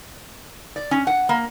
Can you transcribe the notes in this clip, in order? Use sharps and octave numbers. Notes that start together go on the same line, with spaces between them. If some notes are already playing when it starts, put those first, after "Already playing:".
D5
C#4
F#5
A#3